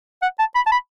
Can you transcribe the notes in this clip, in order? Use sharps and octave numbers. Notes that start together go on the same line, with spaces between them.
F#5
A5
B5
A5
B5